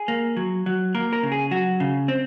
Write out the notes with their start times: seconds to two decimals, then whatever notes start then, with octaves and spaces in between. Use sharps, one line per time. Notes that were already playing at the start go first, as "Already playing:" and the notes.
Already playing: G#4
0.08 A#3
0.37 F#3
0.66 F#3
0.95 A#3 A#4
1.13 A#4
1.23 C#3
1.32 G#4
1.51 F#3 F#4
1.80 C#3
2.08 C4